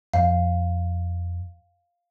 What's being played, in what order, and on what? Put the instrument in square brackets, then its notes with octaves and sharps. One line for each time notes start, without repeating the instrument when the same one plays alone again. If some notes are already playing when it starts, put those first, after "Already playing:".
[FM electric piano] F2 [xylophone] F5